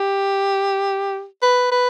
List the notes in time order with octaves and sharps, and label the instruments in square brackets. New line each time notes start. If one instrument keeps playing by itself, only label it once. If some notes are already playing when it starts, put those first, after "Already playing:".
Already playing: [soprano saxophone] G4
B4
B4